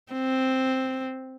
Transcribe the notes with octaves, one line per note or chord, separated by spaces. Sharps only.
C4